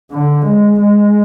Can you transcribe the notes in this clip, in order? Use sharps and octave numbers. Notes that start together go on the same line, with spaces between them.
D3
G#3
G#3